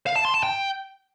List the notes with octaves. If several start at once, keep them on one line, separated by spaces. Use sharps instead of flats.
F5
A5
C6
A5
G5